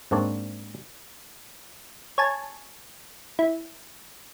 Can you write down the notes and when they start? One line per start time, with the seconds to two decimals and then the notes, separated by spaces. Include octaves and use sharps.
0.11 G#2 A#3 C4 D4 C#5 D5
2.18 C#5 G#5 A5
3.39 E4